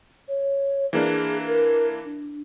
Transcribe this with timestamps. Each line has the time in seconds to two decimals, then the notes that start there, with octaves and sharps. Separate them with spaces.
0.28 C#5
0.93 E3 A#3 D4 G#4
1.47 A#4
2.04 D4